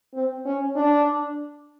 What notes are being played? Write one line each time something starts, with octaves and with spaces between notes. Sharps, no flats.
C4
C#4
D4